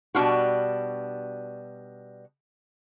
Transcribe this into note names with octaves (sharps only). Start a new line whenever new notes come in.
B2 G3 D4 F4 F#4